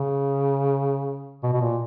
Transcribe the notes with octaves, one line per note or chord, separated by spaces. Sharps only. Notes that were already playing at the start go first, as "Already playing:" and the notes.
Already playing: C#3
B2
B2
A#2